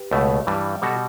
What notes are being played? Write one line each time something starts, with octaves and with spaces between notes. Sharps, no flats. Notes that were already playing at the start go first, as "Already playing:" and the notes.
Already playing: G4 B4
C#2 B2 A3
G2 E3 G3
B2 G3 F#4 A4